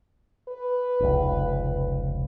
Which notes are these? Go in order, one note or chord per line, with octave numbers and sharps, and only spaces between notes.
B4
F1 C#2